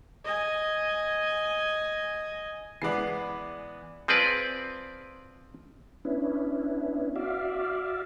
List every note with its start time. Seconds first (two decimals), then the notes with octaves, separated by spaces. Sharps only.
0.24 D#5 G#5
2.82 E3 G#3 B3 D5 C7
4.08 F3 C4 G#4 B4 D5
6.05 B3 C#4 D4 E4
7.16 F#4 D5 E5 F5